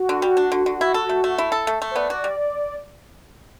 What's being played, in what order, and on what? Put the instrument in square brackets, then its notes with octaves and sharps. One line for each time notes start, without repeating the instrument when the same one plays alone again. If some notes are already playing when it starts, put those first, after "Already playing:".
Already playing: [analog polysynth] F#4
[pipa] D3
G3
D4
D3
D3
E4
A4
A3
A3
E4
A4
A3
A3
[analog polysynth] C5
[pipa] B3 [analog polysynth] D5
[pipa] F#4
G3